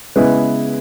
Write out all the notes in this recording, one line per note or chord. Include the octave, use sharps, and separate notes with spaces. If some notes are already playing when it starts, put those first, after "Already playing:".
C#3 G#3 B3 E4 B4